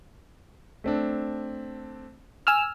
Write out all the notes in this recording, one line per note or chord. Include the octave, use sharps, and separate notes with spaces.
A3 C4 D4
G#5 E6 F6